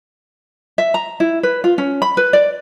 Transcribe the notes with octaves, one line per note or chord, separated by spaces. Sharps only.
E5
A#5
E4
B4
F4
C#4
B5
B4
D5